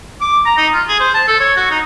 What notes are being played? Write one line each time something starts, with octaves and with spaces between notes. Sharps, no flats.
D6
A#5
D#4
F4
G#4
C5
A5
A4
C#5
F#4
D#4